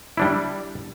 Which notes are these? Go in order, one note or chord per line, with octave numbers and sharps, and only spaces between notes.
G3 D4 E4